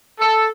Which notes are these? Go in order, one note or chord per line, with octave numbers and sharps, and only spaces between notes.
A4